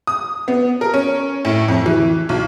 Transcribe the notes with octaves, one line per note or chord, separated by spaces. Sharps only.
D#6
B3
A#4
C#4
A2
F2
E3
B1